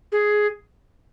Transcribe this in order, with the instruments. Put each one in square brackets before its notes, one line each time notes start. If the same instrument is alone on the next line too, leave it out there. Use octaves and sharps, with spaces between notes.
[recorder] G#4